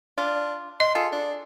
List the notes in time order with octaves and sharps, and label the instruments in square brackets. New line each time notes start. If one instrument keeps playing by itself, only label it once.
[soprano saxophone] D4 [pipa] F4
[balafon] D#5 [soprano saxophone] C6
[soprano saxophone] F4 [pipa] G#4 A4
[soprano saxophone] D4